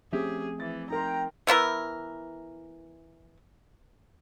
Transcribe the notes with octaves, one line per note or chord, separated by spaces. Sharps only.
F3 A3 C4 C#4 G4 G#4 E5
E3 A6
D#4 A#4 G5 A#5 C6
E3 B3 E4 A#4